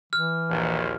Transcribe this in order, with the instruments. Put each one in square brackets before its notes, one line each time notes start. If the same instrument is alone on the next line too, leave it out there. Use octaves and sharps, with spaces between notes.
[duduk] E3 [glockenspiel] F6
[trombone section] A#1 D#2